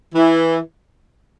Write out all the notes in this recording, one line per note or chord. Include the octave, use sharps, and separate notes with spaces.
E3